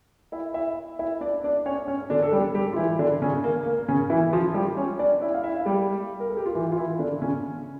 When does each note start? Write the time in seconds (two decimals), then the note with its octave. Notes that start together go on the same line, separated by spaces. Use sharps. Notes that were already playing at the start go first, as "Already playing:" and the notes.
0.32 E4 E5
0.54 E4 E5
0.99 E4 E5
1.21 D4 D5
1.44 D4 D5
1.66 C#4 C#5
1.88 C#4 C#5
2.10 D3 D4
2.23 A4
2.32 G3 G4
2.55 G3 G4
2.73 F4
2.76 E3 E4
2.99 D3 D4
3.22 C#3 C#4
3.44 A#3
3.66 A#3
3.88 C#3 C#4
4.10 E3 E4
4.33 F3 F4
4.54 G3 G4
4.77 C#4 C#5
4.99 D4 D5
5.21 E4 E5
5.34 F5
5.44 E4 E5
5.66 G3 G4
6.20 A#4
6.29 A4
6.37 G4
6.46 F4
6.55 E3 E4
6.72 F4
6.77 E3 E4
6.99 D3 D4
7.22 C#3 C#4